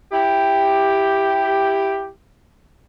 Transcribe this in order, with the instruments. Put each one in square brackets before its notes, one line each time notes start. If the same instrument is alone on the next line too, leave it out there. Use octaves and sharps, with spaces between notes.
[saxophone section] E4 G4